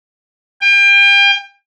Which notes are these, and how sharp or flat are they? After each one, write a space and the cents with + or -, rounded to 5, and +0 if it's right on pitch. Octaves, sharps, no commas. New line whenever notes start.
G5 +35